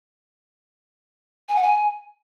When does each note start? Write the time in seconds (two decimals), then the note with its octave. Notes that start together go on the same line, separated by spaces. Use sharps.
1.49 G#5
1.56 F#5
1.62 G#5